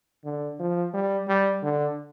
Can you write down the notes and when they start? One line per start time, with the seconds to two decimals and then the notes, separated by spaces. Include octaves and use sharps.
0.25 D3
0.59 F3
0.94 G3
1.28 G3
1.63 D3